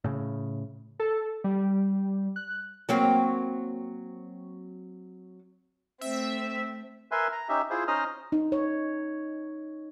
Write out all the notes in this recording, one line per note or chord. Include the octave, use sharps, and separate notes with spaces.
A2 C#3
A4
G3
F#6
F#3 A#3 C4
A3 C4 E5
A#4 B4 E5 G#5 C6
A#5
C#4 D#4 G4 E5
E4 F4 G#4 C5
C#4 D#4 C5 D#5 D#6 F6
D#4
C#5